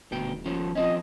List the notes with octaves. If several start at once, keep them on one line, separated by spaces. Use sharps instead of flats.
D#1 D2 B2 G5
F3 C#4
F3 C4 C#4 D#5